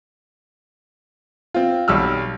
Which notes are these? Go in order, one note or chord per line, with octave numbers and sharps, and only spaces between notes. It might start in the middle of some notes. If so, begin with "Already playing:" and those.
C4 F4
B1 G3 E6 F6